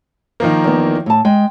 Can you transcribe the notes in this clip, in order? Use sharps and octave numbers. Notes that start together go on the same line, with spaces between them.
D#3 F3 A#3
E2 B3
A2 A5
G#3 G5